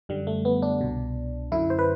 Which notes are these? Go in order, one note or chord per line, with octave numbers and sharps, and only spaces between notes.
F#2 D3 G3
A3
B3
D4
C2 B2
F#2 D3 E4
C5
B4